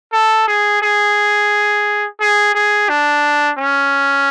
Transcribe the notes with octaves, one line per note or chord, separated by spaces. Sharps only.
A4
G#4
G#4
G#4
G#4
D4
C#4